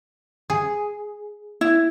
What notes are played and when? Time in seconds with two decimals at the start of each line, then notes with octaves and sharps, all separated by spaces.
0.50 G#4
1.61 E4